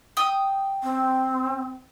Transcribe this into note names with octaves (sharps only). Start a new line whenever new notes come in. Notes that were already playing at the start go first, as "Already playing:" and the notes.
G5 D#6
C4